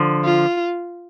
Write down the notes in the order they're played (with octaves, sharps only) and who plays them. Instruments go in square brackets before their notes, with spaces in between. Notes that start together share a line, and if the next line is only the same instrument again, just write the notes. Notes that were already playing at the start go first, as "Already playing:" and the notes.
Already playing: [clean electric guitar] D3 F3
[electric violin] F4